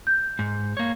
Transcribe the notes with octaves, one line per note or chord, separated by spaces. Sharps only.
G6
G#2
A#3 C#5